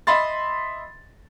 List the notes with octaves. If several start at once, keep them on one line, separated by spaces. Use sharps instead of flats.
D#5 E5 B5 C6 A6